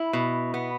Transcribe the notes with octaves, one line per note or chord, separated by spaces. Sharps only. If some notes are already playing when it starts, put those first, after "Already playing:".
Already playing: E4
B2
B3